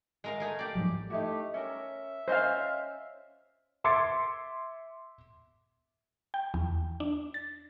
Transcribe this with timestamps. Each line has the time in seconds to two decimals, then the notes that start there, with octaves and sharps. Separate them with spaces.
0.24 G#3 A#4 F5
0.40 A3 G#4 A#4
0.59 G4 D5
0.75 G#2 F3 F#3
1.10 A3 D#4 E4 F#4 G4
1.54 C#4 A#4 E5
2.28 C#4 C5 D#5 F5 G#5
3.84 E5 C6 D6 G#6 A6 C#7
6.34 G5
6.54 E2
7.00 D4
7.34 A6